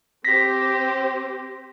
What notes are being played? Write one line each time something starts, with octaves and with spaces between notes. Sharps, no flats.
C4 G4 C5 A#6 B6